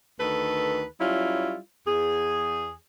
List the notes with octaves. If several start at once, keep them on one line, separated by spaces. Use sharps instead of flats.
D2 D#3 A4 B4
F#3 G3 C#4 E4 F4
E2 G#4